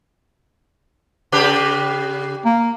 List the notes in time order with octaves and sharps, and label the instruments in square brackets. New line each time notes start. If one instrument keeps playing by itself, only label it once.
[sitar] C#3 G4 B4
[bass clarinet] A#3